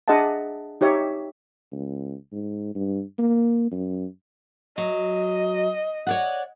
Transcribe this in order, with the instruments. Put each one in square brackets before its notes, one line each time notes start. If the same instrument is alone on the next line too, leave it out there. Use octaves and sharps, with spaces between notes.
[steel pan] D4 G#4 D#5 E5 F#5 A5
D#4 G4 C#5 E5
[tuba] C#2
G#2
G2
A#3
F#2
[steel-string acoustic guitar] F#3 [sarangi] D#5
[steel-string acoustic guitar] C#5 D5 F#5